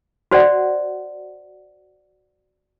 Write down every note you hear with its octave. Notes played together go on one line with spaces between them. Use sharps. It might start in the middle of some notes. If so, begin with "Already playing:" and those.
F#4 C5 D5 F#5